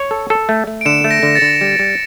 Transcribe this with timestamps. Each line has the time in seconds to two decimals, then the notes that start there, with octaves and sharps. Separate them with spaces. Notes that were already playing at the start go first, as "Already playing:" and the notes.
Already playing: C#5
0.11 A4
0.30 A4
0.49 A3
0.67 A3
0.81 D7
0.85 D3 C#7 E7
1.04 A3
1.11 A#6 D7
1.23 D3 A#6
1.35 A6 C#7
1.42 D3
1.61 G3
1.79 G3